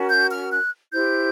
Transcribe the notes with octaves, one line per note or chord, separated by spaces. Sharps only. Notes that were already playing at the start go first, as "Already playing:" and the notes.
Already playing: C#4 F#4 A#4
G6
F6
F#6
E4 G4 C5 G6